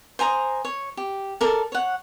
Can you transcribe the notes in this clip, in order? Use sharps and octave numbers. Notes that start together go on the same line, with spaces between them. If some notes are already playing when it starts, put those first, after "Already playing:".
C5 G#5 A#5 D#6
C#5
G4
A4 A#4 D5
C#5 F#5